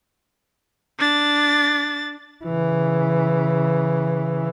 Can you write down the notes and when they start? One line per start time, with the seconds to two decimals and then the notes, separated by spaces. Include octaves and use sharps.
0.99 D4 A6
2.45 C#3 E3